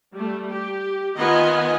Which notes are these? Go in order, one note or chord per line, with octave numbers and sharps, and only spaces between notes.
G3 A3
G4
D#3 B3 F4 D#5 G#5